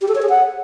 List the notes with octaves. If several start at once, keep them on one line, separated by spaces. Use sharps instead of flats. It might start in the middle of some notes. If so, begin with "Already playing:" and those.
G4
A4
C#5
G#4
F#5